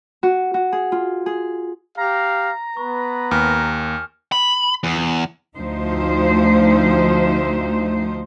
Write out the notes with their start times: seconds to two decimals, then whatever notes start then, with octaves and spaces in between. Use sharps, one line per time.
0.23 F#4
0.54 F#4
0.72 G#4
0.92 F4
1.26 G#4
1.97 G4 F5 A#5
2.77 B3 B4 C#6
3.31 D#2 G#5 D6 F6
4.32 B5
4.84 E2
5.56 D2 F3 A3 D#4 C5